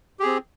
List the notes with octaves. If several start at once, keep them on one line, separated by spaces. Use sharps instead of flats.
C4 G4 G#4